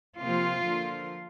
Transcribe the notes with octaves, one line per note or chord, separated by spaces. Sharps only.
C3 F3 A#3 F4
D3 F3 A#3